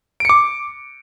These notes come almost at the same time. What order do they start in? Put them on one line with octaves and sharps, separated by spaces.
D7 C#7 D6